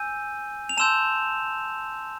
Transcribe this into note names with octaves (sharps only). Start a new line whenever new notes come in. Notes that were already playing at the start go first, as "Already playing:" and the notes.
Already playing: G#5 E6 G6 D#7
F7
A5 C6 E6 G6 E7